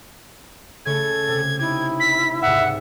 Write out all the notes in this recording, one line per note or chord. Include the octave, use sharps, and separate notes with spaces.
C#3 A3 A4 C#5 G#6
C3
D#4 E4 G4 G#6
B6
C2 G#2 C3 E5 F#5